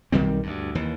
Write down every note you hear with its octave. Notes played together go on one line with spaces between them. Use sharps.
B1 D#3 G3 C4
D2 G2
D#2 E3